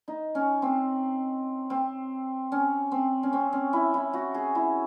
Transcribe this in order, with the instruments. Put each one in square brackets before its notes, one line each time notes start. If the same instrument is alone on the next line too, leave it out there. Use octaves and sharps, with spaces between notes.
[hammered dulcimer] D#4
C#4
C4
C4
C#4
C4
C#4
C4
C#4
E4
E4
F#4
G#4
E4